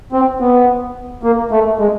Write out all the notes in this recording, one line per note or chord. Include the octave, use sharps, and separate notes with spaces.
C4
B3
A#3
A3
G#3